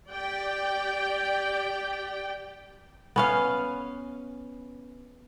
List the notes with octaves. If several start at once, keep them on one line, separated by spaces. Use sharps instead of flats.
G4 D5 G5
B3 C#4 F5